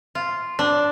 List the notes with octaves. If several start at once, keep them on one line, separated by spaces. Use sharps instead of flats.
F4
D4